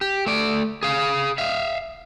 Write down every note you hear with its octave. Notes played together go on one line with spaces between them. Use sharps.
G4
A3 D5
G#4 F5
E5 F5